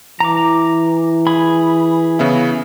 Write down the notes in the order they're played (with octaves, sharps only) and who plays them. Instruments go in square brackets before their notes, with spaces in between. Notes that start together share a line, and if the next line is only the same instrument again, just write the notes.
[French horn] E3 [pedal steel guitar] A#5 D6
[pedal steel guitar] G#4 B5
[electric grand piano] C#3 B3 E4